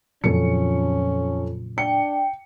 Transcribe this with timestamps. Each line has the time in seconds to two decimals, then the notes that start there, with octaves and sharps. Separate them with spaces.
0.24 F2 A#2 C#3 F#3 C#4 A4 C#7
1.78 D4 G5 C#7